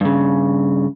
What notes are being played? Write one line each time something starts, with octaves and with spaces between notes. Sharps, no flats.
G2 C#3